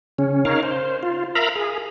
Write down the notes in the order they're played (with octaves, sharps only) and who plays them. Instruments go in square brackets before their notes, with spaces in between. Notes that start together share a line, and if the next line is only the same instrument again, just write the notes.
[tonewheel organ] C#3 C#4
D#4 A#4 C#5 F5
C5
F4
A#4 E5 F5 A#5 B5
G#4